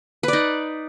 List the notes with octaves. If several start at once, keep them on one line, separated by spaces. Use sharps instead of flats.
D#4 B4 D5